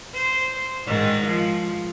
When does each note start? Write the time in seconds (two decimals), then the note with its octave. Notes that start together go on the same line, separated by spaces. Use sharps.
0.14 C5
0.86 G#2 D#3
1.27 F3